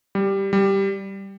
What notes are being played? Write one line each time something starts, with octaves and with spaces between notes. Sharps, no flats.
G3
G3